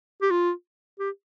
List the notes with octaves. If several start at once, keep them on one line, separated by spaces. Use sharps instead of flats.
G4
F4
G4